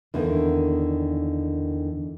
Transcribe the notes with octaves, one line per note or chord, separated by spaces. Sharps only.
E2 D3 D#3 A#3